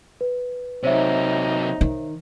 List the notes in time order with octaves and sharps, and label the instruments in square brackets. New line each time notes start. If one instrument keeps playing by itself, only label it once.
[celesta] B4
[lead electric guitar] C3 F#3 [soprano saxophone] D#4 [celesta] C5 C#5 E5
[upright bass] D#3